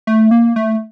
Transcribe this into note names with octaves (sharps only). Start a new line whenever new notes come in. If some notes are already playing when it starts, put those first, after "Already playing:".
A3
A#3
A3